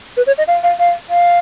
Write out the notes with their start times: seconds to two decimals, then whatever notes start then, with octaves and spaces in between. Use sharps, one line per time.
0.17 B4
0.27 C#5
0.38 D#5
0.48 F5
0.63 F5
0.79 F5
1.10 F5